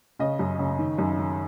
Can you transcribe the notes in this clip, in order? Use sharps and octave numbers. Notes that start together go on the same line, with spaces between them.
C#3 D#5
F#2
C#3
D#3
F#2
D#3